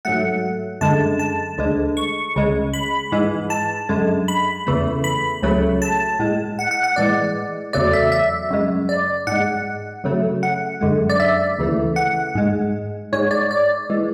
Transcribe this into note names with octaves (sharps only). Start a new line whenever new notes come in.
G#2 F#3 A3 F#5
F#2 D3 G#3 A5
A5
D2 D3 G#3
C#6
C#2 C#3 G#3
B5
G#2 E3 G#3
A5
F#2 D3 G#3
B5
E2 C#3 E3 A3
B5
C#2 C#3 F#3 A3
A5
A2 G#3
F#5
F#5
F#5
A2 E3 G#3 D5
E2 C#3 F#3 A3 D5
E5
E5
F#2 C#3 G#3
D5
G#2 G#3 F#5
F#2 C#3 F#3 A3
F#5
F#2 D3 G#3
D5
E5
D2 C#3 E3 A3
F#5
G#2 G#3
G#2 G#3 C#5
D5
D5
E3 G#3